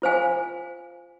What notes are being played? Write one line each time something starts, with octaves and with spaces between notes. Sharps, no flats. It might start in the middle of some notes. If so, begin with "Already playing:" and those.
F4 C5 F5 G#5